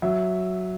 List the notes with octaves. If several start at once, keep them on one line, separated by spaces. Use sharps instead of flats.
F#3 E5